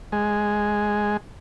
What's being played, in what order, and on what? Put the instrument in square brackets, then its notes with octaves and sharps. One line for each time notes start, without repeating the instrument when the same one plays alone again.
[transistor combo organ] G#3